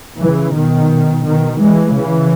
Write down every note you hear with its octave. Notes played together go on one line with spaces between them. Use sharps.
C#3 E3
B2 D#3
B2 D#3
E3 G#3
C#3 E3